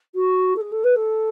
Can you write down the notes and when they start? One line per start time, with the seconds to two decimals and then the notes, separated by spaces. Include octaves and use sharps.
0.15 F#4
0.56 A4
0.61 G#4
0.72 A4
0.84 B4
0.96 A4